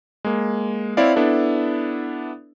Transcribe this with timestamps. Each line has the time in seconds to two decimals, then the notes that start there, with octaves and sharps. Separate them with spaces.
0.25 G#3 A#3
0.97 C4 E4 C#5 D5 F5
1.16 B3 D4 E4 A4